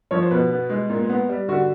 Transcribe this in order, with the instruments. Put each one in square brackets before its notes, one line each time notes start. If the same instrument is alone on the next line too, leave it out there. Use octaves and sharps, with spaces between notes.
[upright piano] F3 C#5
C5
B2 B4
B3
G#3
A#2
B3
G3
D3 F#4